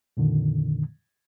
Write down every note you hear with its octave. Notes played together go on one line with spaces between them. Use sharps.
F2 A#2 D3 D#3